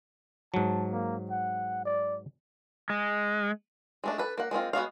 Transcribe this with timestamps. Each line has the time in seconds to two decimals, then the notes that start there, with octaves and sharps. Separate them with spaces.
0.54 G#2 F#3 A5
0.92 A#3
1.31 F#5
1.85 D5
2.90 G#3
4.04 G#3 A3 D4
4.18 A4 B4
4.38 A#3 F#5
4.51 G#3 A#3 C4 F4
4.73 G#3 B3 F#4 F5